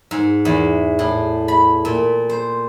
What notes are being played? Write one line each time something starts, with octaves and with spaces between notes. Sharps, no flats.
G#2
E2
A2
B5
A#2
C5